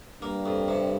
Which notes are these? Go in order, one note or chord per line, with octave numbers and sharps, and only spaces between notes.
G2 A#3
F2
C3